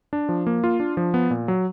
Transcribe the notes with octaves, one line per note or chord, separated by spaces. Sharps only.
D4
F3
A#3
F4
D4
F3
B3
A#2
F#3